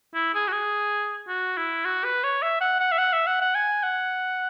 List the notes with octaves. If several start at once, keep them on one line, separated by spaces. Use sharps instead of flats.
E4
G#4
F#4
G#4
F#4
E4
F#4
B4
C#5
E5
F#5
F#5
E5
F#5
E5
F#5
F#5
G#5
F#5